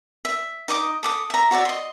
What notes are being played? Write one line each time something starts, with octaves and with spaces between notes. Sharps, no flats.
E5
D#4 D#5 D6 D#6
A4 D6 D#6
E5 A#5
F#4 C#5 D5 E5
D#5 C6